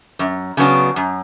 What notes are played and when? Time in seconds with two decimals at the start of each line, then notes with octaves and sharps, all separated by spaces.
0.19 F#2
0.57 C#3 F#3 B3 D4
0.96 F#2